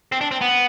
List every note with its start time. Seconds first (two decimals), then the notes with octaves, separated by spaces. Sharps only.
0.12 C4
0.21 D4
0.32 C4
0.41 B3